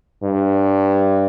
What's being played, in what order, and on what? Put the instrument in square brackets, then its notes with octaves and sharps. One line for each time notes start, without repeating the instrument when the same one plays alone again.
[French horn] G2